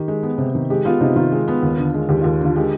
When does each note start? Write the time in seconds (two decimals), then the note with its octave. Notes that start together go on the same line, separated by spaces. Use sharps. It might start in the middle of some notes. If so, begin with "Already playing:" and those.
Already playing: D#3 G4
0.08 G#3
0.23 B3
0.38 C3
0.55 D#3
0.70 G#3 G4
0.85 B3 F4
1.01 C3 D#4
1.16 D#3 F4
1.32 G#3
1.48 B3
1.63 D#2
1.78 D3
1.94 G#3
2.09 D#2 G4
2.21 D#2 F4
2.41 D3 F4
2.56 G#3 G4